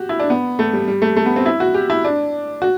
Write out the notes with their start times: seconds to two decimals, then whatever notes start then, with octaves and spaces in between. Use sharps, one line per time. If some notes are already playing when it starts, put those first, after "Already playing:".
Already playing: F#4 G4
0.09 E4
0.19 D4
0.30 B3
0.59 A3
0.73 G3
0.88 G3
1.02 A3
1.16 A3
1.26 B3
1.36 C4
1.46 E4
1.60 F#4
1.74 G4
1.90 E4
2.04 D4
2.62 F#4